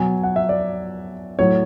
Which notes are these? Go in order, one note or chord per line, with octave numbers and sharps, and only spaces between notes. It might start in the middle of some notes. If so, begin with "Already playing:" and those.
Already playing: B2 F#3 G#5
F#5
E5
D5
A2 F#3 C#5